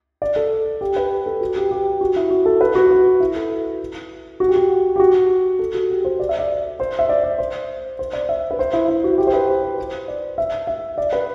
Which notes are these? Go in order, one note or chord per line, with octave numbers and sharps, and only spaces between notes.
D5
A4
G4
B4
A4
F#4
G4
G4
F#4
E4
F#4
A4
B4
F#4
F#4
E4
A4
F#4
G4
F#4
G4
F#4
A4
F#4
G4
C5
D5
E5
D5
C5
E5
D5
D5
C5
C5
D5
E5
B4
C5
E4
E4
F#4
G4
C5
B4
C5
C5
C5
D5
E5
E5
D5
B4